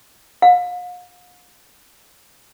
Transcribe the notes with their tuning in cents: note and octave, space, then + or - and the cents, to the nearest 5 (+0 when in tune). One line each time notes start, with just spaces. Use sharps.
F5 +45